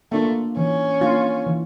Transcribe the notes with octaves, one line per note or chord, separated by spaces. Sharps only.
A3 A#3 D4 F4
E3 C#4
A#3 D4 F4
E3